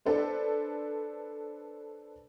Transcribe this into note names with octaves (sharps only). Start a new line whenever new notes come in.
D4 A4 B4 C5